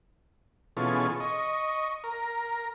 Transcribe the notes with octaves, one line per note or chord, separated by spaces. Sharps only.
B2 E3 C#4 F4 G#4 A4
D#5 C#6
A#4